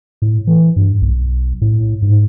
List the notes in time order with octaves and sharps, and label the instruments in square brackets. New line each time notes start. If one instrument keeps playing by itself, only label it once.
[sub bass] A2
E3
G2
B1
A2
G#2